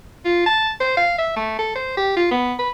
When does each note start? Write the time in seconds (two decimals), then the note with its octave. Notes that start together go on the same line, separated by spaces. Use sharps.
0.25 F4
0.46 A5
0.80 C5
0.97 F5
1.18 E5
1.36 A3
1.59 A4
1.75 C5
1.97 G4
2.17 F4
2.31 B3
2.59 B4